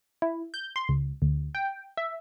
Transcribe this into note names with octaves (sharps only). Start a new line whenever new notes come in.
E4
G6
C6
C#2
D2
G5
E5